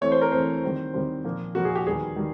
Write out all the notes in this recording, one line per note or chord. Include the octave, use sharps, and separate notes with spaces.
E3 A3 C4 C#5
C5
A#4
E3 A3 C4 C5
D#3 G3 C4
D#3 G3 C4
A#2 F3 A#3
A#2 F3 A#3 F#4
G#4
G4
D#3 G3 B3 G#4
D#3 G3